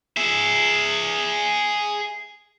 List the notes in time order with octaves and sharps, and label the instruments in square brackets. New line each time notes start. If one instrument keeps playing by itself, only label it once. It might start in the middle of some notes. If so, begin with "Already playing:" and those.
[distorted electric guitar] G#4 E5